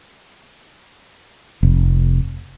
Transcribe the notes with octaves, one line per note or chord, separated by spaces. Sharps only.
F1